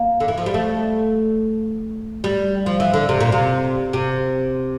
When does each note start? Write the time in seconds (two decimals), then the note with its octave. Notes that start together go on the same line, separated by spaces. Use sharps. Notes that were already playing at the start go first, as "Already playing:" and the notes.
Already playing: A#3
0.20 D3
0.28 E3
0.38 F3
0.46 G3
0.54 A3
2.24 G3
2.66 F3
2.80 E3
2.93 D3
3.09 C3
3.20 A#2
3.32 C3
3.93 C3